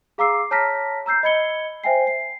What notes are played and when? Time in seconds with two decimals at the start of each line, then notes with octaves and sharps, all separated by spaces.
0.18 G#4 F5 A#5 D6 E6 C7
0.51 C#5 A5 A#5 F6 A#6 B6
1.06 A#5 E6 G6 C7
1.23 D#5 B5 G#6 C#7 G7
1.84 C5 E5 G5 G#5 C7
2.07 C7